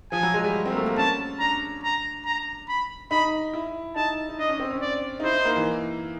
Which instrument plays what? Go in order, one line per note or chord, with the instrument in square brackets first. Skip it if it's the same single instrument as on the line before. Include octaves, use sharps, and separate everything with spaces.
[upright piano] F3 [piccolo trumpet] G#5
[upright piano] F#3
G#3
G3
C4
A#3
A3
A#3
[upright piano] C#4 [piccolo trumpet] A5
[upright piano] D4 [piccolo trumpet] A#5
[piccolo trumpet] A#5
A#5
B5
[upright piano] D#4 [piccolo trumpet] B5
[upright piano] E4
[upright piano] D#4 [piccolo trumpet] A5
[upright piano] D#4
[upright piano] D4 [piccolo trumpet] D#5
[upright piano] C#4
C4
C#4
[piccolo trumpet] D5
[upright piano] D#4
[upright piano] E4 [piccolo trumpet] C5
[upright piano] D#4
A#3
E3